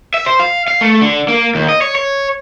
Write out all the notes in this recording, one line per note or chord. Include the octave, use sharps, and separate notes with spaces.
E5
C5
F5
F5
A3
D3
A#3
D#2
D#5
C#5
C#5